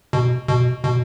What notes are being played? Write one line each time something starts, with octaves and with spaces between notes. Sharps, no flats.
B2
B2
B2